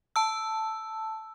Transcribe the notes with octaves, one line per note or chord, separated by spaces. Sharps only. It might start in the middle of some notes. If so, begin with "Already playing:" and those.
A5 E6